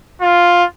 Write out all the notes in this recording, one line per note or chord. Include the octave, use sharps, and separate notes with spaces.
F4